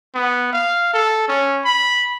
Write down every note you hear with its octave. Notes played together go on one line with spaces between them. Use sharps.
B3
F5
A4
C#4
B5